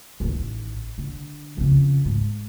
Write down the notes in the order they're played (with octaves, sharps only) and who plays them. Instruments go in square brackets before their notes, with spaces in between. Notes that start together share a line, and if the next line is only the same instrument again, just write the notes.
[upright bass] A1 D#3
D3
F2 C#3
G#2